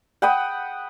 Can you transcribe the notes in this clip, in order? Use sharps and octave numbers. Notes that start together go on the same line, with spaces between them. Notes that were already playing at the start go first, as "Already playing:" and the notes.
F#5 G5 B5 D#6